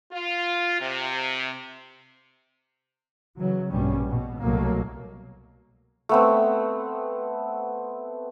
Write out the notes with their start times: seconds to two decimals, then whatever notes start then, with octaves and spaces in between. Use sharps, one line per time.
0.12 F4
0.81 C3
3.38 C#3 E3 F#3
3.71 A#1 G2 B2 G3 C#4
4.07 B2
4.42 C2 B2 F#3 A3 A#3
6.09 A3 B3 C4